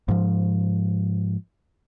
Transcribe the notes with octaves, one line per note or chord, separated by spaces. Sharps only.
G#2 F3